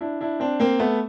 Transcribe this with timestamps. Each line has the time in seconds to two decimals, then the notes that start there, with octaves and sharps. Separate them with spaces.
0.01 D4 E4
0.21 D4 E4
0.40 C4 D4
0.60 A#3 C4
0.79 A3 B3